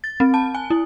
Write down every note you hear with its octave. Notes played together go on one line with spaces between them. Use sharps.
A6
C4
A5
G#5
E4